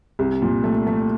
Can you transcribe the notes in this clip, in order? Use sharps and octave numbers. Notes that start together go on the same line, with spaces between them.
C2
A#2
A3
A3